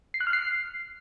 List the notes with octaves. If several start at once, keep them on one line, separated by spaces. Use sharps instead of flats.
C7
F#6
F6
C7